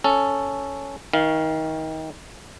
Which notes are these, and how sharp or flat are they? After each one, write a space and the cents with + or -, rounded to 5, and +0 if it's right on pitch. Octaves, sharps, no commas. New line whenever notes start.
C#4 +0 A4 +0
D#3 +30 F5 +0